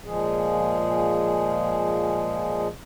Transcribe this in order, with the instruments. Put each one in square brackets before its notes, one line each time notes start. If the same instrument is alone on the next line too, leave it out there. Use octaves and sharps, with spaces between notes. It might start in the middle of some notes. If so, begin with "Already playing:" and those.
[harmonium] A#2 F3 G#3 G#4